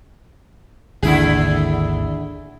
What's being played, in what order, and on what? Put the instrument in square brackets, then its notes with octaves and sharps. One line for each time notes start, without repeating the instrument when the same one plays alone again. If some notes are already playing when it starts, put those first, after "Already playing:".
[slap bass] G#1 D#2 [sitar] D3 E4 G#4